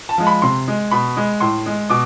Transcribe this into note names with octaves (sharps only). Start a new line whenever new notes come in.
A5
F3 G#3
B5
C3 C6
G#3
B2 B5
G#3
A2 C6
G#3
B2 D6